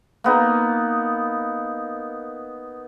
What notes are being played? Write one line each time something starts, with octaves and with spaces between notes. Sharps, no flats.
A#3 B3 D#4